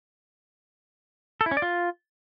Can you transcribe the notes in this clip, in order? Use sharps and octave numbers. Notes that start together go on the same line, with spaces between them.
A4
E4
C#4
D5
F4